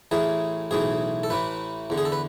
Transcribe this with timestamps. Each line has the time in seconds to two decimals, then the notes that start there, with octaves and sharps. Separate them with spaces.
0.11 A1 A2 E3 G#4
0.71 B1 A2 E3 G#4
1.23 A4
1.30 A1 A2 E3 B4
1.90 E2 D3
1.98 G#4
2.05 A4
2.12 B4